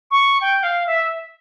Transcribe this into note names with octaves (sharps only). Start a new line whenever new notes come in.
C#6
G5
F5
E5